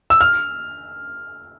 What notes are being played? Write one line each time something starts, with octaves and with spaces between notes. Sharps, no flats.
E6
F6